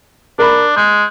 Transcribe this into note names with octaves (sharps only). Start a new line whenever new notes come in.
D4 A#4 A#5 B5
G#3 G6